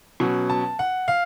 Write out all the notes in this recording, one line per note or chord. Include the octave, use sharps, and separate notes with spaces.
B2 F#3 C#4
A5
F#5
F5